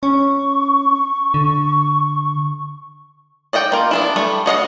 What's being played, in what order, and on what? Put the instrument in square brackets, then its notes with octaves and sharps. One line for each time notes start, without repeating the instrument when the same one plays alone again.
[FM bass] C#4 [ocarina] C#6
[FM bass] D3
[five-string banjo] D5 D#5 F#5 G5
A#3 F4
B3 D4 E4
G3 A3
F#4 D#5 F5 F#5